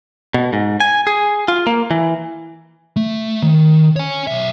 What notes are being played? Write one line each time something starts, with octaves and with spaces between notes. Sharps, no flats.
B2
G#2
G#5
G#4
F4
A#3
E3
A3
D#3
C#5 G#5
B1 E5